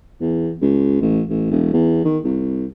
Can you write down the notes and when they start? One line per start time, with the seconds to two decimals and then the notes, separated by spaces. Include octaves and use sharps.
0.21 E2
0.62 C#2
1.02 A1
1.29 A1
1.51 E1
1.73 E2
2.05 D#3
2.24 C2